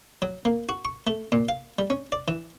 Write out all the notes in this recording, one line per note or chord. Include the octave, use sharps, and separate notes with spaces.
F#3
A#3
F#4
C#6
A3
A#2
F5
G3
C#4
D5
E3